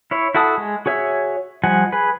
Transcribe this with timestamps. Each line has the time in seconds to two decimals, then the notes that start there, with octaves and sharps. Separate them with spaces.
0.11 E4 C#5
0.35 E4 F#4 A4 A5 D#6
0.58 G#3
0.86 F#4 G#4 C#5 E5
1.64 F3 G3 D#5 F#5 G#5
1.92 G#4 B4